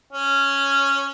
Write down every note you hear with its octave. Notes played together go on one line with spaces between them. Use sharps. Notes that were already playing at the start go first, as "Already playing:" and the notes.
C#4